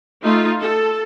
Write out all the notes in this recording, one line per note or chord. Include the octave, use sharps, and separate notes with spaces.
A3 D#4 F4
A4